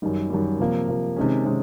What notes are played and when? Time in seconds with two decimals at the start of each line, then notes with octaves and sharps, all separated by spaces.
0.02 F#2 D#3 G3
0.30 F#2 D#3 G3
0.59 C3 F3 A#3
0.88 C3 F3 A#3
1.16 C3 D#3 G#3 C#4
1.45 C3 D#3 G#3 C#4